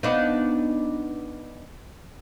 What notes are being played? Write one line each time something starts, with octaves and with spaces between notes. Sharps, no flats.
B3 D4 D#4